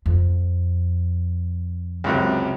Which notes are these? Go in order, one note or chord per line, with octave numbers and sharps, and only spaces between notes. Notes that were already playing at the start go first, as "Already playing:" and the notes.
F2
C#2 F#2 C3